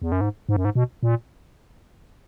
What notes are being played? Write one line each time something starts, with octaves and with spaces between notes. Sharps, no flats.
E2
F#2
G#2
G#2
F#2
G#2
B2
A#2